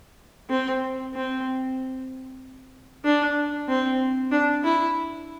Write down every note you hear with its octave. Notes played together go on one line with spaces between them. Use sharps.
C4
C4
D4
C4
D4
E4